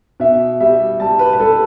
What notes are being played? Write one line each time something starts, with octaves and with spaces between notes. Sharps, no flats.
B2 E5
G3 E5
G3 A5
B4
B4
G3 A4